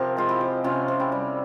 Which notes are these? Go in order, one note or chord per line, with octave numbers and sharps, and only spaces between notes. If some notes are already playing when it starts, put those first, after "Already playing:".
Already playing: C3 F3 G4 A#4
G#3 F4
E4 G4
F3
C3 C#4 F4
C3
E4 G4
G3